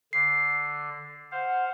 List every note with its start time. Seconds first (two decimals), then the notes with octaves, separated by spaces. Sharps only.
0.13 D3 C7
1.31 C5 F5 F#5